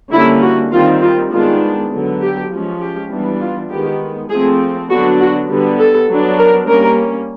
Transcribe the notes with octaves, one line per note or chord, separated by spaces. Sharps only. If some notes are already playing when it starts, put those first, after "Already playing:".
D3 G3 A#3 C#4 E4
F#4
D#3 G3 C4 F4
F4
D#3 G#3 B3 D4 F4
D3 F#3 B3
G4
F3 G#3 C#4
G4
E3 G3 B3 D4
F4
D#3 G#3 B3 G4
F3 A3 C4 G#4
D3 F#3 B3 D4 F#4
F#4
D3 G3 B3
A4
F#3 B3 D4
A#4
G3 A#3 C#4 A#4